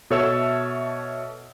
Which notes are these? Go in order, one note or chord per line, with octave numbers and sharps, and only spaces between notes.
B2 A4 C#5 E5 E6